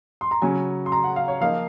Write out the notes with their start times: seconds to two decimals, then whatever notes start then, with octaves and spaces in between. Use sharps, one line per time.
0.21 C6
0.31 A#5
0.42 C#3 F#3 C#4 G#5
0.86 C6
0.92 A#5
1.04 F#5
1.16 F5
1.28 C#5
1.41 F3 A#3 D#4 F5